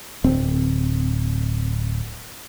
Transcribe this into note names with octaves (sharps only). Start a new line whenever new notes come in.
D1 C4